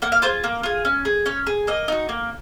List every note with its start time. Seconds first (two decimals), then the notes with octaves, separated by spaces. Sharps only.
0.02 A#3 F#5
0.12 F5
0.22 F4 G#4 C5
0.44 A#3
0.63 F4 G#4
0.85 C#4
1.05 G#4
1.26 C#4 C#5
1.47 G#4
1.67 A#3 D#5
1.88 D#4 F#4
2.09 A#3